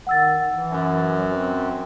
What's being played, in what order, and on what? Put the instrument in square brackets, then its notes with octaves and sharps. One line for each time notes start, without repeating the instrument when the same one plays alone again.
[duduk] D#3 [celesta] F#5 E6 A6
[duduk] E3
[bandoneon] F#2
[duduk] F#3
C4